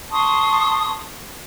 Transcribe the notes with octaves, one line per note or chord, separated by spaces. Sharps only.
A5 C6 C#6 D#6